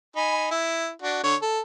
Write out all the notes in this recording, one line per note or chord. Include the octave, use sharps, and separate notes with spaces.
D#4 G#5 B5
E4
D4 F#4
D3 C#5
A4